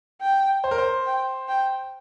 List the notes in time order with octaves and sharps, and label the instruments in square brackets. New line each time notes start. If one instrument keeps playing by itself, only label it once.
[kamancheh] G5
[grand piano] C5
A#4
C5
[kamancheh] G5
G5